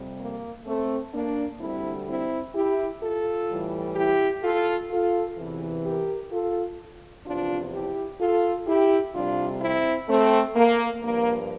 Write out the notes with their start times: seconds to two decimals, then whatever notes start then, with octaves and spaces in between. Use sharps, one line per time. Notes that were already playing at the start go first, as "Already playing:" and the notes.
Already playing: F2 C3 G3
0.19 A#3
0.66 A3 C4
1.13 A#3 D4
1.60 D2 D3 G3 C4 E4
2.07 C4 E4
2.55 E4 G4
3.02 F4 A4
3.49 A2 E3 G3
3.96 E4 G4
4.43 F4 A4
4.90 F4 A4
5.37 E2 C3 E3
5.85 G4 A#4
6.32 F4 A4
7.26 E2 C3 F3 D4 F4
7.73 E4 G4
8.21 F4 A4
8.67 E4 G4
9.14 F2 C3 G3 D4 F4
9.61 C4 E4
10.09 A3 C4
10.56 A#3
11.03 G2 F3 A#3